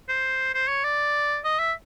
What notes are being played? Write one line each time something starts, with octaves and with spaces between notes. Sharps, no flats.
C5
C5
C#5
D5
D#5
E5